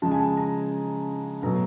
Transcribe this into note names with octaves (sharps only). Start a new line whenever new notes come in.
C#3 F3 G#3 A5
G#5
A5
A#5
B2 F#3 A3 A#5